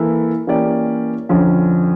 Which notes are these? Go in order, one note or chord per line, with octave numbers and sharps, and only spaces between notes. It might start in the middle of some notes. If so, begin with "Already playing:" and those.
Already playing: E3 A#3 E4 A4
E3 A#3 C#4 G4 D5
F2 D3 F3 C#4